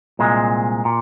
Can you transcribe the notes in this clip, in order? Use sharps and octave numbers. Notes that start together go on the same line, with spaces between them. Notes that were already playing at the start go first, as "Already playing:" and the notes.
C2 A#2 G#3
A#2